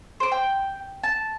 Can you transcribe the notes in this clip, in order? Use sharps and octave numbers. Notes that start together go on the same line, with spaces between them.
C5 D6
G5
A5